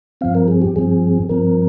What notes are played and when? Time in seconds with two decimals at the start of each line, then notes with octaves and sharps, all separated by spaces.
0.21 G2 F3 C4 F5
0.35 A#4
0.48 G#4
0.62 G4
0.76 G2 F3 C4 G#4
1.29 G2 F3 C4 A#4